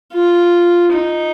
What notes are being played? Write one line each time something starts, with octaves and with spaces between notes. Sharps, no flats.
F4
D#4